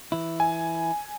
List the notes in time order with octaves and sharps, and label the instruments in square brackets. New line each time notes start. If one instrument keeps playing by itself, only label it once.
[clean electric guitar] E3 E4
[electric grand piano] G#5